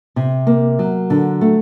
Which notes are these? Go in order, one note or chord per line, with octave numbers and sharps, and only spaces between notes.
C3
A#3
F#3
D3
A3